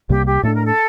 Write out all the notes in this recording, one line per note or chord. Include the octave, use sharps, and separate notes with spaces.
C2 C3 G3 A#3 G4
G4
A2 A3 D4 A4
A#4
A4